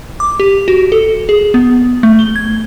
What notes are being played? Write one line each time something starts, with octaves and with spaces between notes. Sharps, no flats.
D6
G4
F#4
A4
G#4
B3
A3
G7
G#6